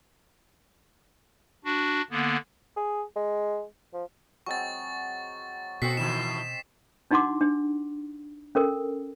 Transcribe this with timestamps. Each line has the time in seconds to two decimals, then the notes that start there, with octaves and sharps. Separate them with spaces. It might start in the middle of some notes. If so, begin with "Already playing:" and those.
1.65 D4 F#4
2.11 D3 A#3 B3
2.77 G#4
3.16 G#3
3.93 F3
4.46 F#3 G#3 C4 C#6 A6
5.82 B2 C4 F#4 A4 D#5 B6 C7
5.97 A2 D#3 E3 E7
7.11 D4 D#4 F#4 F#5 C6 D6
7.41 D4
8.55 C#4 A4 A#4